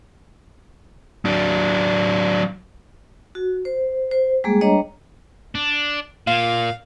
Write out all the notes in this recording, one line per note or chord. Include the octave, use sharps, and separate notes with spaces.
F#3 D4
F#4
C5
C5
G3 G#3 A#3 G#4
G3 D4 C#5 D#5 A#5
D4
A#2 F5